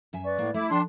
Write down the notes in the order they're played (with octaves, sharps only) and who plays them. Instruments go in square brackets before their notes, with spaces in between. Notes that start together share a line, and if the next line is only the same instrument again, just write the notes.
[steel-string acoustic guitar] F#2 E5 G#5
[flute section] B4 D5 C#6
[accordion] A2 [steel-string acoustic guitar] A#3
[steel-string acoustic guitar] A3 [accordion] E4 [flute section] D6
[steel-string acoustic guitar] F3 [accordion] D4 [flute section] G5 A5 [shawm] C6